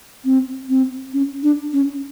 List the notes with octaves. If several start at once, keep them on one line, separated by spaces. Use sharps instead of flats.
C4
C4
C#4
D4
C#4